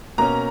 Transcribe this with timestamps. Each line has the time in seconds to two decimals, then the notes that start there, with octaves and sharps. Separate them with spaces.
0.18 B2 A#3 C#4 A#5